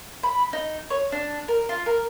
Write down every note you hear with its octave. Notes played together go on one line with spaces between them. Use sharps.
B5
D#4
C#5
D4
A#4
F4
A#4